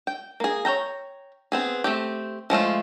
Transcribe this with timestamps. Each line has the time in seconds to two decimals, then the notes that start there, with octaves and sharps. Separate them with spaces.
0.07 G5
0.40 A#3 G#4
0.65 C#5 E5 G5 A#5
1.52 B3 C4 G#4
1.84 A3 C4 G4
2.50 F3 G#3 A3 F4